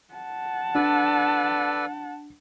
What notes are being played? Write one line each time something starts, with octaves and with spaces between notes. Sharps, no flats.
F#5 A5
D4 A4 B4 D5